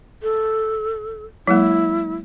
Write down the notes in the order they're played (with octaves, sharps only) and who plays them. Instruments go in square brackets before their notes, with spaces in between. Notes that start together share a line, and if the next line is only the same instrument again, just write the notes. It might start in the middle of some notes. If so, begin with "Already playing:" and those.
[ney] A4
[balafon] F#3 G#3 A#3 [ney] E4